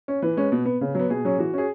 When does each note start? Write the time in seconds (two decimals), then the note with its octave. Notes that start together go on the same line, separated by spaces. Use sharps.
0.08 C#4
0.22 E3 B4
0.37 G#3 C#4
0.52 B2
0.65 B3
0.81 C#3
0.95 F#3 B3
1.10 B2 G#4
1.25 F#3 C#4
1.38 E3 F#4
1.54 C#4 G#4